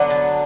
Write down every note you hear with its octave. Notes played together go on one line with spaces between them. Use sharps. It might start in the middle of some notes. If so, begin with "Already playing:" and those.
Already playing: D3 F#3 B3 D4
A5